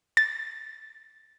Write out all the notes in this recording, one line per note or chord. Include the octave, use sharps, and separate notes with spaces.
A6